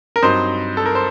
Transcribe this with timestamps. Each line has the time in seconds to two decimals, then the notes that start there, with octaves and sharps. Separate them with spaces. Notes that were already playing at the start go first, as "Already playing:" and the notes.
0.16 A#4
0.22 G2 F#3 C4 D#4 C5
0.77 A4
0.86 A#4
0.95 C5